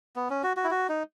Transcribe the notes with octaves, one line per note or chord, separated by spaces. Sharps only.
B3
C#4
F#4
F#4
E4
F#4
D#4